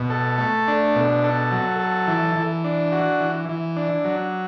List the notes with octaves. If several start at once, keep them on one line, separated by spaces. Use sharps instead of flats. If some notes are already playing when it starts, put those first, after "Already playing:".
Already playing: B2
A4
A3
D4
B2
A4
F#3
A4
E3
E3
D4
F#4
E3
E3
D4
F#3